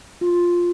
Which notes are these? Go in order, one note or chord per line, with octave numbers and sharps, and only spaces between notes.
F4